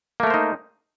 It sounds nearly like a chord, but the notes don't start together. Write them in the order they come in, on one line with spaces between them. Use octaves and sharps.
A#3 A3 A#4 C5 D#4